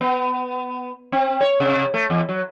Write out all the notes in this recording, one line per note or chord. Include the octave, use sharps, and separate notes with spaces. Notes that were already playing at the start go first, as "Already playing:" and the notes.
B3
C4
C#5
C3
A3
E2
F#3